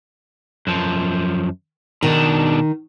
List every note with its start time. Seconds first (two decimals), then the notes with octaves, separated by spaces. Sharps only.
0.67 F#2 F3
2.03 B2 D#3 D4